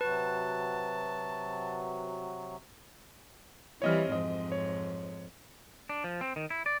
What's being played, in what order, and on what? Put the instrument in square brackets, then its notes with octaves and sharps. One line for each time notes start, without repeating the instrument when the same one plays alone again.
[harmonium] C3 F#3 F#4 [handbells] B4 [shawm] A5
[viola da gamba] E3 G3 C4 [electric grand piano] C#5 D#5 F6
[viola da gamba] F2 G#2 [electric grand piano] D#5
[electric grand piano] C#5
[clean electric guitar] D4
F3
C4
D#3
E4
D5